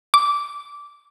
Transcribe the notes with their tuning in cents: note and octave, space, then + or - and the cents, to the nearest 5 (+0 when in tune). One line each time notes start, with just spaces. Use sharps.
D6 -15